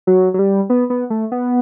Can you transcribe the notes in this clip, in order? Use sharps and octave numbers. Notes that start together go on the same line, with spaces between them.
F#3
F#3
G3
B3
B3
A3
B3